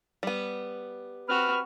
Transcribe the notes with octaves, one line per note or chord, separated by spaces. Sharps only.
G3 B3
C4 F#4 B4 F6